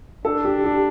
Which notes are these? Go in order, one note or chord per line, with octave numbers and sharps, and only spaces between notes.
D4 A4
G4
G4